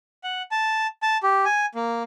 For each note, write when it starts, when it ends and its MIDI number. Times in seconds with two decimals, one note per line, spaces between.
0.24 0.42 78
0.51 0.87 81
1.02 1.17 81
1.23 1.45 67
1.45 1.66 80
1.75 2.03 58